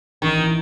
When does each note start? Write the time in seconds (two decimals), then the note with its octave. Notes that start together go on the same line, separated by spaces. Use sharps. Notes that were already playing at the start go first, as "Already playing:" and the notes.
0.22 A1 D#3
0.38 E3